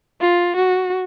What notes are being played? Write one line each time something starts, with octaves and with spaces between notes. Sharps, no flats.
F4
F#4